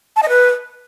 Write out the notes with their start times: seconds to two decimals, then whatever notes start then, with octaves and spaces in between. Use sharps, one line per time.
0.16 A5
0.23 D#5
0.29 B4